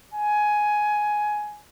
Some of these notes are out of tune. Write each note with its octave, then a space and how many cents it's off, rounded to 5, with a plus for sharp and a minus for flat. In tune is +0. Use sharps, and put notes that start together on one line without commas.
G#5 +10